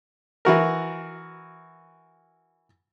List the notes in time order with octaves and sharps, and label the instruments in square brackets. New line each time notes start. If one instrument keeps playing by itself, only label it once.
[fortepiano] E3 F#4 A#4